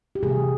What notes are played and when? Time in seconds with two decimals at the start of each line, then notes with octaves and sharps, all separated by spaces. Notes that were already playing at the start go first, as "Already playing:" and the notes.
0.15 G4
0.23 C3 E3 A3 G#4